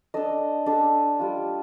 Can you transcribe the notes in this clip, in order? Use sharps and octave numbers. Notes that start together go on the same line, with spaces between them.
D4 A4 D#5
D4 A4 D#5
G3 D4 F4